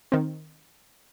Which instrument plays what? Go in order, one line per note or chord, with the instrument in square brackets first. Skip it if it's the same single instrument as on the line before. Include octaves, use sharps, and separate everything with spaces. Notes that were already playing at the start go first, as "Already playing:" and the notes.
[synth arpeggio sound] D#3 C4